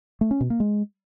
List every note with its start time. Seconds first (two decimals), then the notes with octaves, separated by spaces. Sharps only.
0.21 A3
0.31 C#4
0.41 B2
0.50 A#3
0.60 G#3